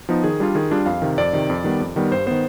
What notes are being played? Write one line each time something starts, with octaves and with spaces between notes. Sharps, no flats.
F3 B3 D#4
D#3 G#4
G3 D4 F4
D#3 G#4
G3 D4 F4
F2 F5
C3 D#3
F2 D5
C3 D#3
F2
D#3 G3 B3
F2
D#3 G3 B3
G2 C5
D#3 B3 C5